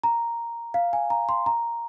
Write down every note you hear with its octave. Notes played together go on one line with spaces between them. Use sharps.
A#5
F5
G#5
A#5
C6
A#5